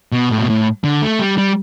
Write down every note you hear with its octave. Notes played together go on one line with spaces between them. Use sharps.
B2
A2
B2
A2
D3
A3
G3
G3